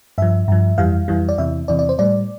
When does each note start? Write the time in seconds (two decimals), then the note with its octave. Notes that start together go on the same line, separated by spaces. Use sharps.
0.18 G2 F3 E5
0.48 G2 F3
0.78 F2 E3 G3 F5
1.08 F2 E3 G3
1.29 D5
1.38 E2 C3 E3 E5
1.68 E2 C3 E3 D5
1.79 D5
1.89 C5
1.99 A2 G3 D5